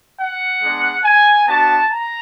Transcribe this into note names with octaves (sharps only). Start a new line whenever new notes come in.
F#5
G#3 B3 D4
G#5
B3 D4 F#4 A5
A#5